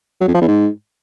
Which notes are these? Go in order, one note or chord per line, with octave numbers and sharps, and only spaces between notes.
F#3
F2
F3
E2
G#2